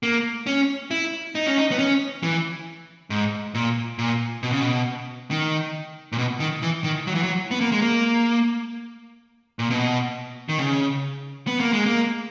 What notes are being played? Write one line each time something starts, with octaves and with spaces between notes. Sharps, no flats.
A#3
C#4
E4
D#4
C#4
D#4
B3
C#4
E3
G#2
A#2
A#2
B2
C#3
B2
D#3
A#2
B2
D#3
E3
D#3
F#3
E3
F#3
B3
A#3
G#3
A#3
A#2
B2
D#3
C#3
B3
A#3
G#3
A#3